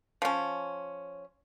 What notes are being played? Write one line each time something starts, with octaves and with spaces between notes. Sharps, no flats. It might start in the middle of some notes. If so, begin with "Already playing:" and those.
F3 C#4